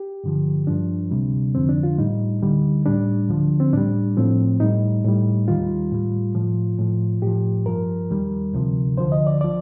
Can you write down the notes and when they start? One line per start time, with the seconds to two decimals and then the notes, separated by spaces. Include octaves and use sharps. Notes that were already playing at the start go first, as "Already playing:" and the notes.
Already playing: G4
0.24 G2 D3 F3
0.67 G2 F3 D4
1.11 D2 C3 G3
1.55 F2 D3 F3 C4
1.69 D4
1.83 F4
1.98 A2 G3 D#4
2.42 D2 D3 G3
2.86 A2 G3 D4
3.29 D2 D3 F3
3.60 C4
3.73 A2 G3 D4
4.17 A2 F3 C4
4.60 A2 G3 D#4
5.04 A2 G3
5.48 D#2 D#3 G3 F4
5.91 A2 G3
6.35 A2 F3
6.79 A2 F3
7.22 A2 F3 G4
7.66 G2 F3 A#4
8.10 D#2 D#3 G3
8.53 D2 C3 F3
8.97 D2 D3 F3 C5
9.12 D#5
9.27 D5
9.41 F3 D5